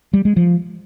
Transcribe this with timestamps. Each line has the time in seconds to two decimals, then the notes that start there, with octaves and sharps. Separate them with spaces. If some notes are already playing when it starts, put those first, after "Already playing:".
0.14 G3
0.25 G#3
0.37 F3